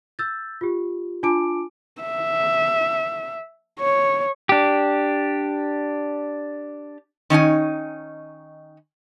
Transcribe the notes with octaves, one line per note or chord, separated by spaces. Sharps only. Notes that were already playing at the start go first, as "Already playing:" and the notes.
E6 G6 A6
F4 G4
D4 F4 G#5 A5 D6 D7
E5
C#5
D4 G4
D#3 C#4 D#4 G#5